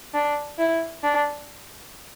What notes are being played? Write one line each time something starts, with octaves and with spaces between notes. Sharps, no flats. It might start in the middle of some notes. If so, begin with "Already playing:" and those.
D4
E4
D4